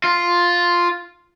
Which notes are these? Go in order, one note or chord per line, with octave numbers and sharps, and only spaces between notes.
F4